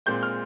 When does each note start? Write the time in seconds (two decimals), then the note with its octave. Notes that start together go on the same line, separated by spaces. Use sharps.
0.06 A#2 G#3 C4 G6
0.23 F6